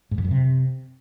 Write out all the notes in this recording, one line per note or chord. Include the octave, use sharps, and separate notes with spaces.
G#2
F2
F#2
C3